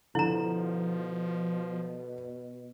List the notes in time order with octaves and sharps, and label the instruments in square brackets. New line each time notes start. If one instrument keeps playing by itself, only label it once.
[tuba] B2 [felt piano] D3 [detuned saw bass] F3 [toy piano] E4 A#5